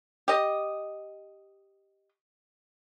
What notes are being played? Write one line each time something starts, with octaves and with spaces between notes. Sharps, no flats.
G4 D#5